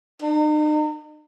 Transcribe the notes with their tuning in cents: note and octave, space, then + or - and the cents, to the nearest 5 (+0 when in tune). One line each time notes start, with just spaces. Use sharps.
D#4 -40